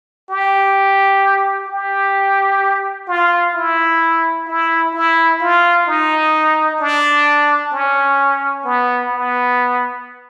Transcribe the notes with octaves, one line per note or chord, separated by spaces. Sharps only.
G4
G4
F4
E4
E4
E4
F4
D#4
D4
C#4
B3
B3